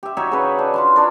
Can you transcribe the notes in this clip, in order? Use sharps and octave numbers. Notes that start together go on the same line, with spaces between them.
G4 E5
D#4 F#4 C#5 E5
C#3 B4
D4
F4 A5 C6
D4 A#4 C#5